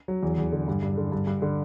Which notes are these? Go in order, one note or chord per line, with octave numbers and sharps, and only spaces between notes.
F#3
E2
E2
D3
G2
G2
D3
G2
G2
D3